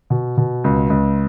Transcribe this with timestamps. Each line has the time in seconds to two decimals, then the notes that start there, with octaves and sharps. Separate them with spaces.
0.10 B2
0.37 B2
0.64 C#2
0.90 C#2